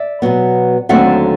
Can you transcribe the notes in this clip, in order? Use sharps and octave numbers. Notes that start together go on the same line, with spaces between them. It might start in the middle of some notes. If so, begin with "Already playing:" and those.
Already playing: D5 E5
B2 F#3 B3
D#2 D3 F#3 A3 C4 E5 F#5